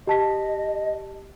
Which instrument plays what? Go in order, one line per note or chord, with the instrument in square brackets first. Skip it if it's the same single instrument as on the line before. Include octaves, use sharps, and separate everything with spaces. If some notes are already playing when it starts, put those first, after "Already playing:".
[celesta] G4 A5 B6 [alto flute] D#5